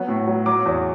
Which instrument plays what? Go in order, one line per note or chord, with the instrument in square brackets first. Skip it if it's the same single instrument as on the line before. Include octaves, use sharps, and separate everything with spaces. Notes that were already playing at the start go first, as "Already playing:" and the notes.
Already playing: [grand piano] F#3 B3
A2
F#3
F#3 D6
E2